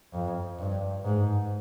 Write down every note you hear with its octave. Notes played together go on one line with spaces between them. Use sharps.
F2
G2
G#2